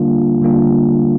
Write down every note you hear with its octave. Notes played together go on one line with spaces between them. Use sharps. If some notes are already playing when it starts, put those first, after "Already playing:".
Already playing: D3 G3 A#3 D4 F4
D3 G3 A#3 D4 F4